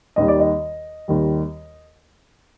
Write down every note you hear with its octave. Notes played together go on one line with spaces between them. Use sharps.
D#2 D#3 G3 D#5
D5
D#5
D#2 D#3 G3